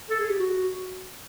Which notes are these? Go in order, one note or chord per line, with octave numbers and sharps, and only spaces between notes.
A4
G#4
G4
F#4